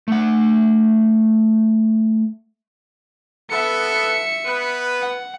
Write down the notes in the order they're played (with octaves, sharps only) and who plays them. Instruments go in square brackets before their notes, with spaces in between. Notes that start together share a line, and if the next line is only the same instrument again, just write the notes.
[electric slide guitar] A3 F#5
[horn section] B3 A4 [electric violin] E5 C#7
[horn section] B3 B4
[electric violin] F#5